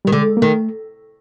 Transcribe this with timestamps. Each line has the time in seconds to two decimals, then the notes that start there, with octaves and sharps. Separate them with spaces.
0.05 D#3 G3
0.12 D3 G#3
0.37 A#3
0.42 D#3 A3